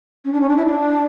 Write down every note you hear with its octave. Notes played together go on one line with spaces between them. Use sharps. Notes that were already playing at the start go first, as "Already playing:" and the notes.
C#4
D4
C#4
D4
E4
D4